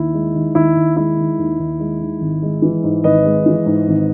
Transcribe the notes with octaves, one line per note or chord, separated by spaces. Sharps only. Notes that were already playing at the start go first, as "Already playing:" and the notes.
Already playing: D#2 E4
G#3
D#3
D#2 E4
D#2
G#3 E4
D#3
D#2
D#2
G#3
D#3
G#1
G#3
E3
G#2
G#1 B4 D#5
G#3
E3
G#2
G#1